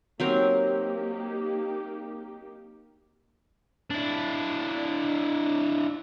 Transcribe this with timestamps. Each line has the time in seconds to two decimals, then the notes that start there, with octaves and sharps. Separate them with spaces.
0.20 F#3 A#3 C4 D#4 G4 A#4
3.90 D4 E4